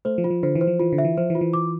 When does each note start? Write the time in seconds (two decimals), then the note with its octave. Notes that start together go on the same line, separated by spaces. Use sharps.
0.05 A3 C5
0.18 F3
0.24 F4
0.31 F3
0.43 D3 C5
0.55 E3
0.61 C5
0.67 F3
0.80 E3 F4
0.93 D3
0.98 E5
1.04 E3
1.18 F3 C5
1.30 E3
1.35 F4
1.41 E3
1.54 D6